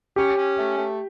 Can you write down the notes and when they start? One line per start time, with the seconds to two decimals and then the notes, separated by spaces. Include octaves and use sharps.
0.16 C#4 G4
0.37 C#4
0.57 A3
0.77 A3